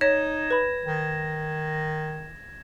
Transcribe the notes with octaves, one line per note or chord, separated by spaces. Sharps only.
D#4 C#5 G#6 A#6 E7
B4 B5
D#3